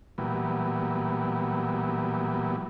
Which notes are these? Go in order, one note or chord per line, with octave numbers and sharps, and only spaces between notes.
A#2 E3 F#3 G3 B3